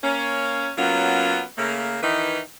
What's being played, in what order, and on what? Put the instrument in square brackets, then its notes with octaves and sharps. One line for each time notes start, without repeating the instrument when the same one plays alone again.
[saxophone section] A#3 C#4
F#3 A#3 B3 C#4 F4
C#3 A3 A#3
D#3 E3 D#4 E4 B4